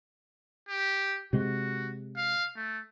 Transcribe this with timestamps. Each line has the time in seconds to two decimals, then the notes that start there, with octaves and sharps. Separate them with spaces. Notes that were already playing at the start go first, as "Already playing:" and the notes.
0.69 G4
1.33 C3 G#3 F#4
2.17 F5
2.56 A3